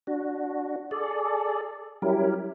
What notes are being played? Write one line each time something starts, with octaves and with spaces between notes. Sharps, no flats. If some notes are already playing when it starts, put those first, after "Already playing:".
D4 F#4
G#4 A4 D5
F#3 G3 C#4 E4 G4 A#4